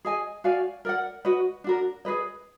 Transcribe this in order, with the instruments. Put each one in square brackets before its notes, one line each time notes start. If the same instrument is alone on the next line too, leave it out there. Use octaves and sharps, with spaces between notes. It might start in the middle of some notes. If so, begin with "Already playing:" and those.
[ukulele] G#4 D#5 G#5
F#4 D5 F5 G#5
A#4 D5 F#5
F#4 B4 D#5
D4 F#4 A#4
G#4 B4 D#5